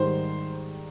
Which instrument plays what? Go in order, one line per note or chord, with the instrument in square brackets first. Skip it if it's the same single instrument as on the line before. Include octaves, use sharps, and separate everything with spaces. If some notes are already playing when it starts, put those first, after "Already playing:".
Already playing: [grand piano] G#2 D#3 G3 C5